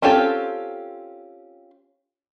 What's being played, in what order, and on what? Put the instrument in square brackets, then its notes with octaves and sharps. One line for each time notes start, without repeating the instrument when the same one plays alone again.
[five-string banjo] C4 C#4 F4 G4 A4